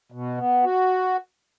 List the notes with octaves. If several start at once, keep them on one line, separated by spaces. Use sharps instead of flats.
B2
B3
F#4